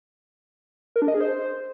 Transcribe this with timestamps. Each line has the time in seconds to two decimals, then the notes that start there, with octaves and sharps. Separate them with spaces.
0.96 A#4
1.02 D4
1.08 D#5
1.14 G#4
1.20 C5